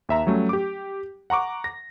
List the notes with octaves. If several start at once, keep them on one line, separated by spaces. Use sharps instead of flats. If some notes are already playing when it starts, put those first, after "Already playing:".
D#2 E5 A#5
F#3 G3 A3 C#4
G4 D6
F#5 A#5 C#6 D6
A#6